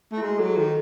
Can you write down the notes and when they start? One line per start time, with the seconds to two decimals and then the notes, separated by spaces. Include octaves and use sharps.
0.12 A3
0.17 E4
0.22 G#3 F#4
0.38 F#3 A4
0.46 G#4
0.57 D#3 A4